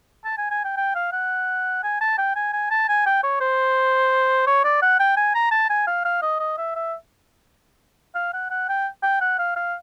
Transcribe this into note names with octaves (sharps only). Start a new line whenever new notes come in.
A5
G#5
G#5
G5
G5
F5
F#5
G#5
A5
G5
G#5
G#5
A5
G#5
G5
C#5
C5
C#5
D5
F#5
G5
G#5
A#5
A5
G#5
F5
F5
D#5
D#5
E5
E5
F5
F#5
F#5
G5
G5
F#5
F5
F5